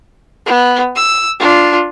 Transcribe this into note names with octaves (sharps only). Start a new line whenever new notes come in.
B3
E6
D4 F4